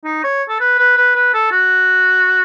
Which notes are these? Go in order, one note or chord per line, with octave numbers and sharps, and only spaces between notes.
D#4
C#5
A4
B4
B4
B4
B4
A4
F#4